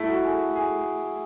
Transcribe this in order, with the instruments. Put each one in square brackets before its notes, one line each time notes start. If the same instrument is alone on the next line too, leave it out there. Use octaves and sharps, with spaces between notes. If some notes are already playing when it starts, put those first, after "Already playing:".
Already playing: [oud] A3 [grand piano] E4
[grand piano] F#4
G#4
G#4